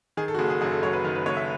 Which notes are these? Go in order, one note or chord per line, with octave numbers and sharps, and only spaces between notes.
D#3 G#4
A4
F#4
F#1 G#4
G#4
F#2 G#4
A4
F#3 C#5
B4
D#3
B4
F#1 C#5
E5